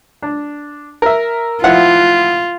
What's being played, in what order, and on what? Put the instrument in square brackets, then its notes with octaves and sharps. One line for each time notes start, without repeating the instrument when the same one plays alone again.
[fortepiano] D4
A#4 E5
[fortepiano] F3 E4 F#5 [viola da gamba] F4